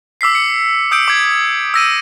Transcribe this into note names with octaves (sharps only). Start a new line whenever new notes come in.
D6 E6 B6 C7
C#7
D#6 E6 G6 C#7 D7
D6 G#6
E6 A#6 D#7